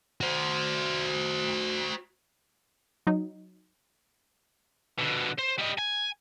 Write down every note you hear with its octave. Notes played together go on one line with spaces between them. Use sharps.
F#4 C5
F#3 D#4
B2 D3
C5
G3 D#5
G#5